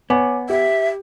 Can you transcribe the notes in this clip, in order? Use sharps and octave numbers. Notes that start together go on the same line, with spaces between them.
B3 C#5 G#5 D6
G4 E5